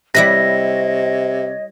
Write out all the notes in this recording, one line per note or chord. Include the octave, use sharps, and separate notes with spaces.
C3 G3 E4 B4 C#5 D#5 A#6